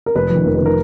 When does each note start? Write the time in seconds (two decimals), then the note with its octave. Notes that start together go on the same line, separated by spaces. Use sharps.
0.06 A#4
0.15 F1 B4
0.30 F2 D#3
0.45 F1 A#4
0.55 B4
0.61 D#3
0.66 A#4